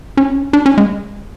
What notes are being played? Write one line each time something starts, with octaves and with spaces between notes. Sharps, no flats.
C#4
D4
C#4
G#3